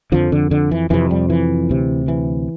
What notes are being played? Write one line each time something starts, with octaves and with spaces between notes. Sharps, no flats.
F2 D3 F3
D3
D3
E3
F2 C3 E3
G3
E3
D2 C3
E3